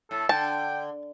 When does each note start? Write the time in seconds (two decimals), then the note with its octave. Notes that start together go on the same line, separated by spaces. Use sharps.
0.11 A2 A4
0.29 D3 G5 A5